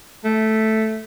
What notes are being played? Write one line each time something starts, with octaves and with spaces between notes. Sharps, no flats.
A3